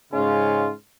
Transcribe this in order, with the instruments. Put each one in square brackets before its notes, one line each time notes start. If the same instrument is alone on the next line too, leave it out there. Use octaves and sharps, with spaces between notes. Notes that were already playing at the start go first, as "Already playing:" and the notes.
[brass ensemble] G#2 C#3 G#3 C#4 F4